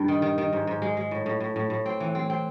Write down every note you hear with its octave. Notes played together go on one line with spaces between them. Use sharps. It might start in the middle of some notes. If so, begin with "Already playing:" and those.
Already playing: G2 G3
D#3
D#3
D#3
G#2
G#2
G#3
G#3
A2
A2
A2
A2
A2
C4
E3
C4
C4